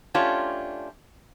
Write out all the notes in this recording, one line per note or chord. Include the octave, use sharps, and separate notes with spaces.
A3 C#4 D4 F4 G4 C#5